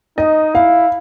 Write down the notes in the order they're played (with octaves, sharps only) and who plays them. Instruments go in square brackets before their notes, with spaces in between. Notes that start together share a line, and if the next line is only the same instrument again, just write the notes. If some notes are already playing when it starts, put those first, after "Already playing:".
[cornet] D#4 [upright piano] D#5
[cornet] E4 [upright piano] F5